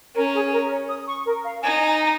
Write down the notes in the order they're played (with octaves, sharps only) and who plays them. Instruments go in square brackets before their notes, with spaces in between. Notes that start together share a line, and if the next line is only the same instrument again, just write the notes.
[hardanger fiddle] C#4 [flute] A#4
[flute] G#4
A#4
C#5
D#6
C#6
A#4
F5
[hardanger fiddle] D#4 [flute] G#5
[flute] G#5
A#5